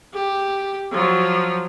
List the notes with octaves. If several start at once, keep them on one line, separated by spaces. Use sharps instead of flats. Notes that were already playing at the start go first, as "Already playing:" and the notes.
G4
F3 F#3